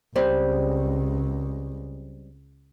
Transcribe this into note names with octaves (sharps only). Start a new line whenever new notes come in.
C#2 G3 C4